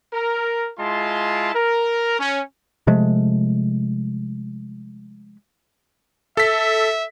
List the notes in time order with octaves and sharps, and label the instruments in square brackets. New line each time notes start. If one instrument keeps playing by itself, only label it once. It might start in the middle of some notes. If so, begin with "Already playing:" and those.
[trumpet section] A#4
G#3 E4 F4 A5 C6
A#4
C#4
[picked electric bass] C3 F3 G#3 A3
[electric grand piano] A4 B6 [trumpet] E5